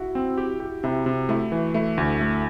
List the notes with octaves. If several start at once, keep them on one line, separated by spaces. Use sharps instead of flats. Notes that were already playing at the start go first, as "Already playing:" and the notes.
Already playing: E4 F#4
C4
G4
G4
C3 E4
C3
A3 E4
E3
A3 E4
D2
A3